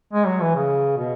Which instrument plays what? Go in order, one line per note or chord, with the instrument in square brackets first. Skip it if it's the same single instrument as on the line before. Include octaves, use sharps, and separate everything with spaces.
[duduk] G#3
F#3
E3
C#3
B2